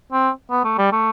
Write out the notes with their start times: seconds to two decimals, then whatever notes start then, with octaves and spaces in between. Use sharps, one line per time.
0.13 C4
0.51 B3
0.64 A3
0.78 G3
0.92 A3